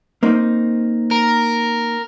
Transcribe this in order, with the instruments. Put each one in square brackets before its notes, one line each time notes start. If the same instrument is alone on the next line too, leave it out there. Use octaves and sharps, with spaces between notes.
[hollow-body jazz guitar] A#3 C4 D#4
[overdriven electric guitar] A#4